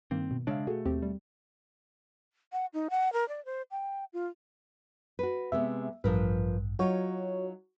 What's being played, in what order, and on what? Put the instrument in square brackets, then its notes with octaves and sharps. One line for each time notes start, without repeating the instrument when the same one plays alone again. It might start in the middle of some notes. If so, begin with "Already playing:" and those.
[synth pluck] G2 D#3 A#3 [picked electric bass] C4
[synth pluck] B2
[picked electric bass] C#3 G#3 D4 [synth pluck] C#5 E5 F5
[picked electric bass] B2 A3 [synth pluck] F#4 G#4 A4
[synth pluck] D#2 C4 G4
G3
[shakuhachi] F#5
D#4
F#5
A#4
D5
C5
G5
F4
[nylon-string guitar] F#4 B4
[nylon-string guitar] C3 G#3 B3 [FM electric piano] E5
[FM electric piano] A1 G2 [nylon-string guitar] F3 A#4 B4
[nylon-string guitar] F#3 D#4 F4 [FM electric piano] F#4 C#5